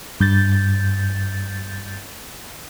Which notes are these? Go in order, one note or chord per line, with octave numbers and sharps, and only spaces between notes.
G2 G6 A6